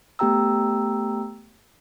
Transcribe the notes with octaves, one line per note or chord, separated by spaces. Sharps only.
A3 B3 G4 G5 A#5 E6